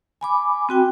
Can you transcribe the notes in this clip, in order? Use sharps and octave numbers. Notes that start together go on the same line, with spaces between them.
G#5 B5 D6
C4 F#4 G5